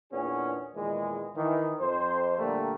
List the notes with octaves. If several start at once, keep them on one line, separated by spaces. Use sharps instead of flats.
E2 A#2 B3 C#4 D4 G#4
E2 A#2 D#3 E3 G#3
D#3 E3
F2 C5
A#2 D3 G3 A3 A#3